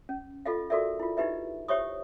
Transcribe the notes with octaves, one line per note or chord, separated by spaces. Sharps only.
C#4
F4 A4 D#5 F5
F#4 A4 A#4 D5 E5
E4 F4
D#4 E4 G4 B4 D#5 E5
G4 C5 C#5 E5 C#6 D#6